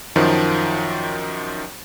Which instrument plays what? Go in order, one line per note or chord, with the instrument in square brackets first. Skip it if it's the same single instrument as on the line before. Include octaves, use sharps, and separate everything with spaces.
[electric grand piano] F#2 D#3 F3